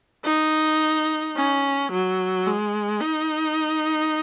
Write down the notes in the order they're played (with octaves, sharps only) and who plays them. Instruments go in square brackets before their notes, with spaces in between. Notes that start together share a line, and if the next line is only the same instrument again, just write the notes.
[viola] D#4
C#4
F#3
G#3
D#4